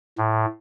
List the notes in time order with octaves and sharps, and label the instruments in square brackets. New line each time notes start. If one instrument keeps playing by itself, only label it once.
[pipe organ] A2